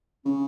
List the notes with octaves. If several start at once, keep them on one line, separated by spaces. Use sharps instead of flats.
C#3 C#4